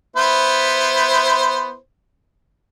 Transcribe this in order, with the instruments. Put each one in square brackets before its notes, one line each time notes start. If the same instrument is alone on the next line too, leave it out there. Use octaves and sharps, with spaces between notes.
[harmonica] B3 E4 C5